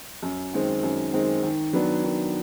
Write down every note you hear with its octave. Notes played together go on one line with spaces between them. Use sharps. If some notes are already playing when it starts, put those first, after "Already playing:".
F#2
D#3 G#3 C4
F#2
D#3 G#3 C4
D#3
F#3 B3 D4
D#3